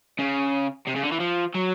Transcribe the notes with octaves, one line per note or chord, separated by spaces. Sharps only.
C#3
C3
C#3
D3
E3
F3
F#3